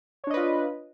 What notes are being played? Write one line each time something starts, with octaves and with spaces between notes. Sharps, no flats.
D4 F4 B4 C#5 D#5